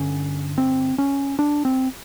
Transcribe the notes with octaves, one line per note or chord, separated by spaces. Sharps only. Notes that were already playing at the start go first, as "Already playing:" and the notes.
Already playing: G2 D3 C#4
C4
C#4
D4
C4